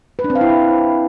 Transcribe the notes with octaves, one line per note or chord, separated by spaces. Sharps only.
B4
D4
C4
F5
E4